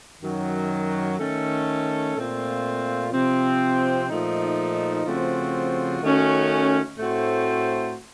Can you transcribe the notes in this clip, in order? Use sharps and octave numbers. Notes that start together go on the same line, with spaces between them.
F#2 D#3 F#3
D#3 A3 C#4 A4
A#2 A3 C4 F4
C3 F3 C4
A#2 F3 A3 D#4
C#3 F3 A3 C4 F#4
D#3 A3 C#4 F#4
A2 A3 C4 F#4 C5